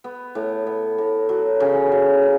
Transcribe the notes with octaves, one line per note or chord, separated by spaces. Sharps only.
B3
A2
B3
A2
F#3
C#3
F#3
C#3